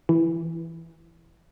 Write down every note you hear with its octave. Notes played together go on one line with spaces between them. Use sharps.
E3